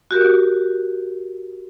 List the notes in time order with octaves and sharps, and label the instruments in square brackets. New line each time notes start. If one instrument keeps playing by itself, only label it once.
[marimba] F#4 G4 A#4